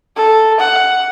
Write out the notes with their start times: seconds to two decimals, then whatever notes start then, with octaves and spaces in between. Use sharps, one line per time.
0.16 A4
0.60 F#5